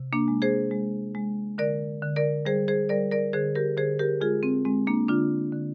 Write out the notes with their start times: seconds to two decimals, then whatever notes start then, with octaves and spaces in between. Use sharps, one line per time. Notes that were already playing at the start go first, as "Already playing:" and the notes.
Already playing: C3
0.13 A#3 D4
0.28 G#3
0.42 G#4 C5
0.71 G#3
1.15 G#3
1.58 D3 A#4 D5
2.02 D3
2.16 A#4 D5
2.45 G3 G#4 C5
2.68 G#4 C5
2.89 G3 A#4 D5
3.12 A#4 D5
3.33 D3 G#4 C5
3.55 G4 A#4
3.77 D3 G#4 C5
3.99 G4 A#4
4.21 G#3 F4 G#4
4.43 C4
4.65 G#3 C4
4.87 A#3 D4
5.08 D3 D4 F4
5.52 D3